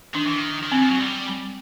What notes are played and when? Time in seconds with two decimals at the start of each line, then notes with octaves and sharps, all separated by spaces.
0.14 D#3 D4
0.27 E3
0.38 D#3
0.64 D#3
0.72 E3 C4
0.81 F3
0.90 F#3
1.00 G3